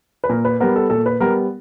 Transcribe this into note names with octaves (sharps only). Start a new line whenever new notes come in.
B4
A#2 A#4
B4
G3 B3 A#4
A4
A#2 A4
B4
G3 B3 A#4